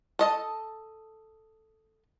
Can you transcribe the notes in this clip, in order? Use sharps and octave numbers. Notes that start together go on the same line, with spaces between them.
A4 D#5 A5